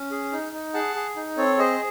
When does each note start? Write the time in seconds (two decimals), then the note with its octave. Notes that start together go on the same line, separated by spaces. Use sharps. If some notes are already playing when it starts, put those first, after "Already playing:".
Already playing: C#4
0.11 G#4
0.32 D#4
0.53 D#4
0.74 G#4 F#5 A5
0.95 G#4
1.16 D#4
1.37 C4 A4 C#5
1.59 G#4 C5 D#5